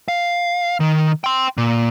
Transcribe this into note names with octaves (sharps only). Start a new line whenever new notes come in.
F5
D#3
G5 C6
A#2